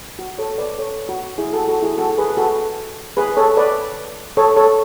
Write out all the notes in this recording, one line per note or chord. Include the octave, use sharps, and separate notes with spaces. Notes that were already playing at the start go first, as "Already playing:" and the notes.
F#4
A4 C#5
B4 D5
A4 C#5
F#4
E4 G#4
F#4 A4
F#4 A4
E4 G#4
F#4 A4
G#4 B4
B4
F#4 A4
G#4 B4
A4 C#5
B4 D5
A4 C#5
A4 C#5